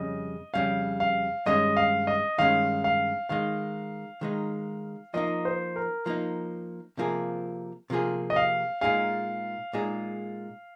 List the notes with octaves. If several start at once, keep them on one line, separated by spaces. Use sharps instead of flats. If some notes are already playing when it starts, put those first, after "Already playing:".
Already playing: F2 C#3 G3 C#4 D#5
F2 C#3 G3 C#4 F5
F5
G2 D#3 G#3 C#4 D#5
F5
D#5
G2 D#3 G#3 C#4 F5
F5
D#3 G#3 D#4 F5
D#3 G#3 D#4
F3 A#3 D#4 D#5
C5
A#4
F3 A#3 D#4
C3 F3 A#3 F4 G#4
C3 F3 A#3 F4 G#4
D#5
F5
A#2 G#3 D#4 G#4 F5
A#2 G#3 D#4 G#4